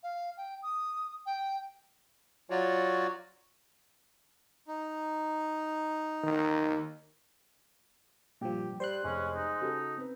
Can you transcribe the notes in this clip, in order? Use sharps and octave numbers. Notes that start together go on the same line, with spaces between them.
F5
G5
D#6
G5
F#3 F4 F#4 C#5 D5
D#4
D#3
G2 A#2 F3 G4
G3 C5 C6 F#6
F1 G#3 C#4
D#4
C#3 F#4 A4
C4 B4